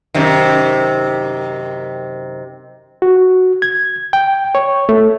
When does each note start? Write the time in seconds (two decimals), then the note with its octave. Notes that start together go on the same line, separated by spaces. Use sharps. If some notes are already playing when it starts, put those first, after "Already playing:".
0.14 F#2 C3 D#3
3.02 F#4
3.62 G#6
4.13 G5
4.55 C#5
4.89 A3